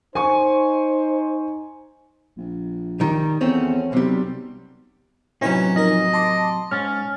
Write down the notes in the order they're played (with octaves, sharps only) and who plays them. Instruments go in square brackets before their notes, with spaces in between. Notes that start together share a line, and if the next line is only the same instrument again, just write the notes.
[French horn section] D#4 [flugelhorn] C5 [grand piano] G#5 C#6
[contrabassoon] A#1
[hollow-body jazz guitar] D#3 G3
[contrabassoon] E2 [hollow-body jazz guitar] A3 C4 C#4
[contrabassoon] B1 [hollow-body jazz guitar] C3 G3
[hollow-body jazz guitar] A2 C3 F#3 [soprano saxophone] C#4 [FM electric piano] D#4 E4 B4
[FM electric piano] F3 D#4 A#4 [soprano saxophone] D#5
[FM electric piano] A5 C6 D6
[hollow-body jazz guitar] G#2 [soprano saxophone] C#4 [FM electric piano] F6 A6